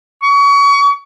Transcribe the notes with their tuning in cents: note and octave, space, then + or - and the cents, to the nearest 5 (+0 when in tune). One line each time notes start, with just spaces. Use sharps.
C#6 +30